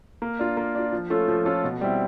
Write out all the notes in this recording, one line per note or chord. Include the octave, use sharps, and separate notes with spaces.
A#3
D4 F4
A#3
D4 F4
F3
A3 C#4 F4 A4
F3
A3 C#4 F4 A4
B2
G3 C4 E4